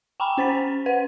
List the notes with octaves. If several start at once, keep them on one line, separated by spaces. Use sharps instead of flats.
G5 G#5 A#5 B5
C#4 C5 A6 B6
B4 F#5